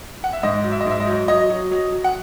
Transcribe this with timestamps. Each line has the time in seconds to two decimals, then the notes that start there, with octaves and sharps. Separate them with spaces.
0.24 F#5
0.33 E5
0.43 G#2 D#5
0.64 F#3
0.72 E5
0.80 D#5
0.86 G#2 E5
1.00 D#5
1.07 F#3
1.28 F#3 D#5
1.50 F#3
1.71 F#3
1.92 F#3
2.04 F#5